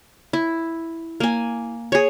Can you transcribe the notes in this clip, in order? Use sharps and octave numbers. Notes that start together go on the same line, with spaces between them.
E4
A#3 G#5
G#4 C#5